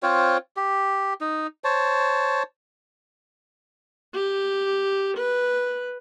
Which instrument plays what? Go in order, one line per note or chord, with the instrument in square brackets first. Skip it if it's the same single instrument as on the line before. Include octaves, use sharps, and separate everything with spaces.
[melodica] C4 F4 C5 C#5
G4
D#4
C5 C#5 A5
[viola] G4
B4